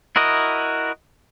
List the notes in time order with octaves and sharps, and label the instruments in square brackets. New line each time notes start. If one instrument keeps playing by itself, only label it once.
[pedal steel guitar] E4 F#4 A#4 D#5